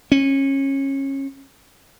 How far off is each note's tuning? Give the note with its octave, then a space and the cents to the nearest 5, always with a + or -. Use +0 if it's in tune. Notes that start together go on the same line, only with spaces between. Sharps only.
C#4 -25